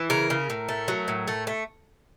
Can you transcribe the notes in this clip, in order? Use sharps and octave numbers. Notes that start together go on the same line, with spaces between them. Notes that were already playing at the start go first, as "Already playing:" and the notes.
Already playing: E3
C#3 A#4
C#3
A2
A3
F#3
A2
A3
A3